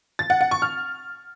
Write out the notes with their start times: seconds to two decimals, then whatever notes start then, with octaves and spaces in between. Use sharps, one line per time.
0.19 A6
0.30 F#5
0.41 F#5
0.51 C#6
0.62 F6